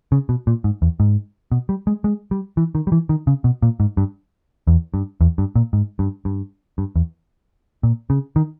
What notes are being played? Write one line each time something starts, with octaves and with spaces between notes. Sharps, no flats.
C#3
B2
A#2
G#2
E2
G#2
B2
G3
G#3
G#3
G3
E3
D#3
G3
E3
D#3
C#3
B2
A#2
G#2
G2
E2
G2
E2
G2
A#2
G#2
G2
G2
G2
E2
A#2
C#3
D#3